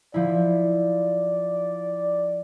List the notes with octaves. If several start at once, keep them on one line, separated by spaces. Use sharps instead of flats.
F3 E4 D5